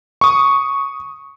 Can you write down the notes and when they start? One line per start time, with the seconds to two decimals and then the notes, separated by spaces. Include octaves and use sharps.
0.21 C#6 D#6